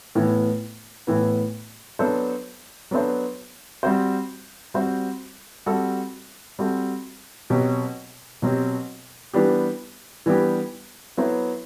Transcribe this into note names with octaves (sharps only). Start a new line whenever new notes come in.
A2 E3 B3
A2 E3 B3
F#3 B3 D4 A4 C5
F#3 B3 D4 A4 C5
G3 C4 F#4 C5
G3 C4 F#4 C5
G3 C4 F#4 A4
G3 C4 F#4 A4
B2 F#3 C4 G4
B2 F#3 C4 G4
E3 G3 B3 D4 G4
E3 G3 B3 D4 G4
F#3 B3 E4 A4 C5